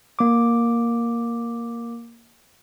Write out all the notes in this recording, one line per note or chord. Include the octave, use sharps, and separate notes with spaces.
A#3 D6